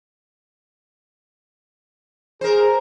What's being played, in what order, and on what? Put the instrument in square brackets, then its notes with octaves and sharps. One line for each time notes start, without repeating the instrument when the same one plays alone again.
[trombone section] G#4 [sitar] A#4 C5